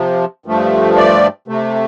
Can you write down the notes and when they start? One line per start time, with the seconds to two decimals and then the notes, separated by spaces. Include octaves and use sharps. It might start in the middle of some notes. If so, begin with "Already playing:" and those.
Already playing: C3 F3
0.46 G2 F3 A3
0.96 D5
1.48 C3 A3